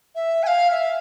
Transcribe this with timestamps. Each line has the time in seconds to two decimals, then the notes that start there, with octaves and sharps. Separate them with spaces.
0.15 E5
0.43 G#5
0.47 F5
0.71 E5